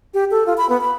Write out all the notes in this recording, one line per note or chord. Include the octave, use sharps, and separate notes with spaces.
G4
A4
F4
B5
B3
B5